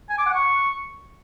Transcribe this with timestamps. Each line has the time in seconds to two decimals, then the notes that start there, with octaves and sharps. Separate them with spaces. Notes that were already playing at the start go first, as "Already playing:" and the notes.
0.10 G#5
0.18 D6
0.26 F#5
0.35 C#6